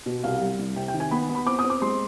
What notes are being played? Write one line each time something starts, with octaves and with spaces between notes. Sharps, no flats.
B2
C2 F5
G3
C2
C3 G5
G5
D#3
G#5
B3 B5
B3
B5
C4 D6
D#6
C4
D6
G#3 C6